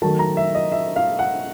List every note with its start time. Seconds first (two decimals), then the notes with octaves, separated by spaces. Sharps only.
0.02 D#3 F#3 A3 A5
0.19 A#5
0.37 E5
0.55 D#5
0.72 E5
0.96 F5
1.19 F#5